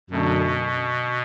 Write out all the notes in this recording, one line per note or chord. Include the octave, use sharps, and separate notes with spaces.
F#2 B2 D3 A3